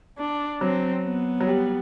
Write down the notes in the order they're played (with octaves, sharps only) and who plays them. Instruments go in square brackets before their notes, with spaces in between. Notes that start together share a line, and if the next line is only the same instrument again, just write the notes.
[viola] D4
[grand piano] F#3 [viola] C4
[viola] B3
[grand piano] F#3
G3